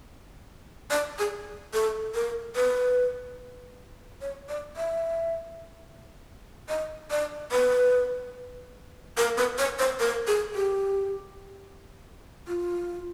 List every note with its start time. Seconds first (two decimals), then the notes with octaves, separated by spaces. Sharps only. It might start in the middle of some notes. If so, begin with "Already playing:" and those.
0.91 D5
1.19 G#4
1.74 A4
2.15 A#4
2.56 B4
4.21 C#5
4.49 D5
4.76 E5
6.69 D#5
7.11 D5
7.52 B4
9.17 A#4
9.38 B4
9.58 C#5
9.79 C5
10.00 A#4
10.27 G#4
10.55 G4
12.48 F4